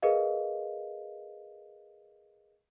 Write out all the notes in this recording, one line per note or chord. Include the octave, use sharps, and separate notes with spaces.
G#4 A#4 B4 D#5 F5